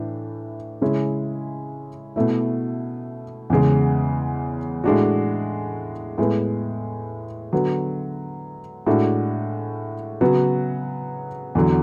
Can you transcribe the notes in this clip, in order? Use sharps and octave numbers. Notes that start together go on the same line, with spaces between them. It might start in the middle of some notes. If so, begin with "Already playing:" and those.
Already playing: A2 E3 D4
C#3 G#3 C#4 E4
B2 A3 E4
E2 C#3 G#3
A2 G#3 D4 F#4
A2 G#3 B3
D3 F#3 B3 F#4
A2 G#3 D4 F#4
C#3 F#3 B3 F#4
E2 D3 F#3